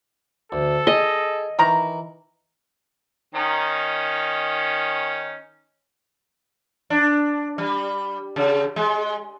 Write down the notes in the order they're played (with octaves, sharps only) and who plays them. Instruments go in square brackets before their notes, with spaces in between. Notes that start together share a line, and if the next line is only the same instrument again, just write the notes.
[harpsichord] D2 [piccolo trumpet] A4
[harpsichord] G#4 [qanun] D#5
[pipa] D#3 A#5 [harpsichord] E3
[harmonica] D#3 C#4 D#4
[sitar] D4
G3
C#3
G#3